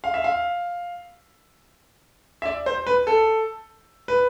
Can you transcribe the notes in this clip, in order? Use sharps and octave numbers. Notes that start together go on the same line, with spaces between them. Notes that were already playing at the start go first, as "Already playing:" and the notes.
F5
E5
F5
E5
D5
C5
B4
A4
B4